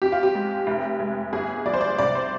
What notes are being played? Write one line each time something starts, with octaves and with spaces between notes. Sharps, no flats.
F2 G4
F4
G4
G#3
F1
G#3
G1 G#4
F3 D5
C5
D5
C2 D5
C5